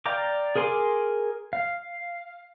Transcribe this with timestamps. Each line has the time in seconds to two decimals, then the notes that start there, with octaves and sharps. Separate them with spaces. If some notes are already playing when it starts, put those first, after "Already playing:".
0.06 D5 F5 G5 A#5 D6
0.56 G#4 A#4 G#5 C6 D6
1.53 F5